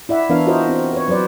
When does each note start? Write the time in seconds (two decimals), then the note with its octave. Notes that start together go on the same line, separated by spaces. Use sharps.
0.09 E4 D5 E5 F#5
0.29 E3 B3 D4 A#4 C#5 F5
0.47 F4 F#4 A#4 C5 D#5 E5
0.69 C4
0.93 B4 C#5
1.08 F#3 B4 C5 D5